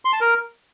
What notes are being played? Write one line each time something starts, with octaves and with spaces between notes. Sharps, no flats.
C6
A5
A#4